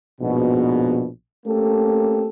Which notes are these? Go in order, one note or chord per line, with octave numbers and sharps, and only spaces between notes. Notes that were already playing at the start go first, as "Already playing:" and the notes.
A#1 F2 G#2 B2
A3 A#3 C4 C#4 G4 A4